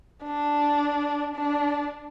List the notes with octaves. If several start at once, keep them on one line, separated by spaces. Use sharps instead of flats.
D4
D4